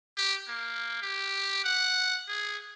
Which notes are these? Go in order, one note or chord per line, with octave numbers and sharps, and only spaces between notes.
G4
A#3
G4
F#5
G#4